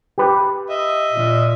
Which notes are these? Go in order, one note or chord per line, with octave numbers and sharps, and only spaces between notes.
G4 B4
D#5 E5
A#2